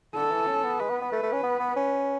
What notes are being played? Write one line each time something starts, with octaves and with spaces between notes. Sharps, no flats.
D3 A4
E3
C#4
B3
G#3 B4
B3
B3
A3
A3
C#4
B3
B3
C#4